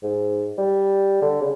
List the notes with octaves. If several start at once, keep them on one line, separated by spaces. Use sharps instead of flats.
G#2
G3
D3
C#3